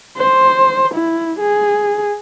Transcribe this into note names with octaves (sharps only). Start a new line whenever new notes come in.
C5
E4
G#4